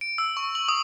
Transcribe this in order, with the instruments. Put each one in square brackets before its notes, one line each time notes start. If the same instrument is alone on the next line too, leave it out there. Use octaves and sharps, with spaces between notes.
[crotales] D7
E6
C#6
F#7
D#6